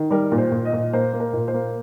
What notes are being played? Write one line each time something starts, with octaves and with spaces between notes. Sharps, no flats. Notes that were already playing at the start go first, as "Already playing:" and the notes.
Already playing: D#3
G3 A#4
A#2
C5
A#2
D#5
A#2
A#3 C5
A#3
A#4
A#2
C5
A#3